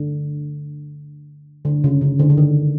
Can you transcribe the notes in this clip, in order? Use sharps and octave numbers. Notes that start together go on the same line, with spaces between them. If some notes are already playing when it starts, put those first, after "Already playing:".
Already playing: D3
D3
C#3
C#3
D3
D3
D#3